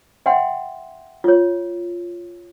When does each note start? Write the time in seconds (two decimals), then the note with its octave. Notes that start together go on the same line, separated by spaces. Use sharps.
0.26 E5 F#5 G5 C6
1.24 F4 C#5